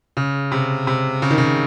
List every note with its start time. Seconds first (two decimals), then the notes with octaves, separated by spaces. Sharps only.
0.17 C#3
0.52 C3
0.87 C3
1.22 C#3
1.30 D#3
1.38 C#3